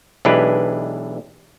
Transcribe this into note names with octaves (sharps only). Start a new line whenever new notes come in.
B1 E3 G#3 D4 G4 B4